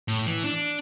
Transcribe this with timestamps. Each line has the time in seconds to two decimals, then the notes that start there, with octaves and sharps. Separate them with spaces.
0.08 A2
0.26 E3
0.45 D4